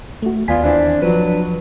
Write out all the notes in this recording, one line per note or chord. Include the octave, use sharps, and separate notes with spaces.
A3 F#4
D#2 B3 F4 D5 G#5 B6
E3 C4 D4
F3 F#3 D4 B4